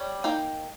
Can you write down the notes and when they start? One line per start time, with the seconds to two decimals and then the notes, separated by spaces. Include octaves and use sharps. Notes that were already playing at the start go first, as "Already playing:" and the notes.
Already playing: G3 C#5
0.24 A#3 D#4 G5